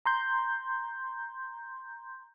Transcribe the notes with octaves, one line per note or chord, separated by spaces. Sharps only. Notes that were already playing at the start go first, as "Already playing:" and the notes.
A#5 C6 G6